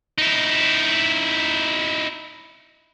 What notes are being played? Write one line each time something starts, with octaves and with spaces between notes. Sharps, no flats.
D#4 E4